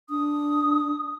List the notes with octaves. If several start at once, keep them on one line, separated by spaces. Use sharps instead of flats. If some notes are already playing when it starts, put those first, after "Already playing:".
D4 D#6